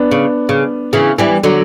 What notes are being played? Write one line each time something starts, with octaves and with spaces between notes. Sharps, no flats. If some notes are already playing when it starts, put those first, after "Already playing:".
Already playing: B3 D4
C#3
C#3
C#3 E3
E3 G3
D3 F#3